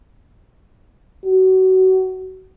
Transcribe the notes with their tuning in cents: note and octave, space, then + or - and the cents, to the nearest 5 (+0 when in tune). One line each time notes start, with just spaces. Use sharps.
F#4 +30